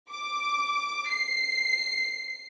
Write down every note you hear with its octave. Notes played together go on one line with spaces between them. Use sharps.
D6
C7